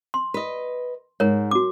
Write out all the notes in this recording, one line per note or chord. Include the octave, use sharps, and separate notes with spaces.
C6
B4 D#5
G#2 A#4 C#5
F#4 D6